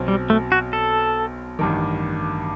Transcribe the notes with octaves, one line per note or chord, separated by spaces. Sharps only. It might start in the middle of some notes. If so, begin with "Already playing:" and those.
Already playing: B1 B2 F#3 C4
G3
A3
F#4
A4
A1 G2 D#3